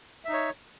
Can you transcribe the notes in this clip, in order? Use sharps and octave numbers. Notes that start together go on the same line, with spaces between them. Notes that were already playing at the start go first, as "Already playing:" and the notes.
D#4 C#5 E5